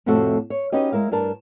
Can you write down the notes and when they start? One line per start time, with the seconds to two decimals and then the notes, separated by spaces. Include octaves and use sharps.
0.06 F2 A2 C3 A3 F#4 A4
0.50 C#5
0.72 C#4 D#4 F#4 G4 B4 D#5
0.92 G#3 E4 A#4 F5
1.12 G2 D4 A#4 A5